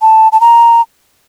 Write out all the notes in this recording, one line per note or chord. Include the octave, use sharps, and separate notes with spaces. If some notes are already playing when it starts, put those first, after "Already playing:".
A5
A5
A#5